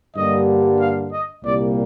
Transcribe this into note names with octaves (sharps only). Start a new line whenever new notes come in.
G2 D3 G3 A#3 D#5
F5
D#5
C2 A#2 G3 A#3 D5